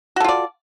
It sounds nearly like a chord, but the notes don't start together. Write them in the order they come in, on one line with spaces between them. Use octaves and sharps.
F#4 A4 F4 D5